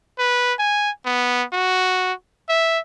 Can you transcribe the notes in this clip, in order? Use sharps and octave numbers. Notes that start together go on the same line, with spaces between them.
B4
G#5
B3
F#4
E5